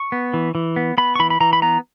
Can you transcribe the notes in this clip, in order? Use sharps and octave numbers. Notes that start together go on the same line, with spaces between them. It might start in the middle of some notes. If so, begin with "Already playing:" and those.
Already playing: C#6
B3
E3
E3
B3
B3 B5
C#6
E3 B5
B5
E3 A#5
B5
B3 A#5